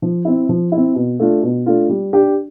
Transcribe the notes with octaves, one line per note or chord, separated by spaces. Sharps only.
F3
C4 E4
F3
C4 E4
B2
A3 D4 F4
B2
A3 D4 F4
G3
D4 G4